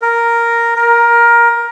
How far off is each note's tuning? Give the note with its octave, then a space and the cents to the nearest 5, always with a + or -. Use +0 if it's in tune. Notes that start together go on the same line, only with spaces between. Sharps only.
A#4 +0
A#4 +15